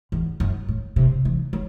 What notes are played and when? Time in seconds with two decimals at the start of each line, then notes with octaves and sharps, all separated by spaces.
0.12 E2
0.40 F#2
0.69 A2
0.96 C3
1.25 E3
1.53 F#3